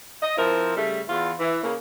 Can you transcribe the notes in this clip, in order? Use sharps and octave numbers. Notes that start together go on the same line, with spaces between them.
D#5
F3 C4 E4 A#4
C#3 G3 A3
E2 F4
E3
C#3 A#3